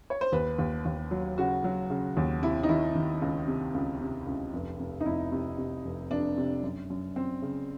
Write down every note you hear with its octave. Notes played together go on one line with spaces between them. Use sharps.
C#5
C5
D#2 B4
D#2
D#2
F#3
C#3 F#4
F#3
C#3
D#2
C3 E4
D#4
D#3 E4
D#3
C#2
C3
C#2
C3
C#2
F1
F1
D#4
F1 E4
C3
C3
F1
F1 D4
C3
F#2
F#2
F#2 C4
C#3